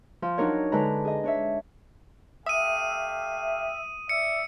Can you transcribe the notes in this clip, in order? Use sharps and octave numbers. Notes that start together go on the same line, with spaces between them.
F3
F#3 D4 D#4 A#4 C#5
D3 G#3 B4 A#5
G#4 D#5
D4 C#5 E5
A3 G4 E5 F5 D#6 D#7
D5 E5 C#7